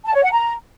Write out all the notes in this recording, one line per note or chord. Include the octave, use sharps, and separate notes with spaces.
A5
C#5
F#5
A#5